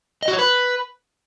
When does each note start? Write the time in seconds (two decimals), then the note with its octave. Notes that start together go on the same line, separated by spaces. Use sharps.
0.23 D#5
0.28 F#4
0.33 C#5
0.39 B4